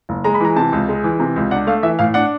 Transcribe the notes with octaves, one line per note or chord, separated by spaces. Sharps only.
F#1
G#3 A#5
B5
E3 A#5
C3 A5
C#2
G#3
E3
C3
C#2
D4 F#5
A3 F5
E3 E5
A2 F5
D4 F#5